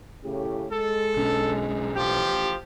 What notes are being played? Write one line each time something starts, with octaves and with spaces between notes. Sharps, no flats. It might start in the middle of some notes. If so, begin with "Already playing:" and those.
A2 C#3 G4
G#3 A4
B1 C#4 D4
A1 F3 G4